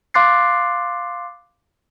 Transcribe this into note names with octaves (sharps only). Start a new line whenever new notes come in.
F5 C6 D6 F#6 A6 C7